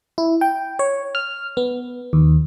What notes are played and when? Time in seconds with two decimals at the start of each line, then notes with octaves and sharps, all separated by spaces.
0.18 E4
0.41 G5
0.79 C#5
1.15 F6
1.57 B3
2.13 D#2